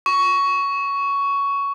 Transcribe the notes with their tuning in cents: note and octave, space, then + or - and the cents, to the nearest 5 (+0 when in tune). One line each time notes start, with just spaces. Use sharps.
C#6 +10